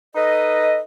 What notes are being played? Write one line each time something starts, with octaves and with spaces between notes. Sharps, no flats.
D#4 A4 B4 D#5